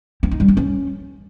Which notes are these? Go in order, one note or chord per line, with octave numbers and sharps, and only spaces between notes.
C4
D#4
G3
D4
C#4